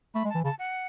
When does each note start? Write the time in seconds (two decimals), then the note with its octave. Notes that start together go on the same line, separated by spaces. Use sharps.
0.14 A3 B5
0.25 G#3
0.30 A5
0.35 E3
0.44 C#3 A5
0.59 F#5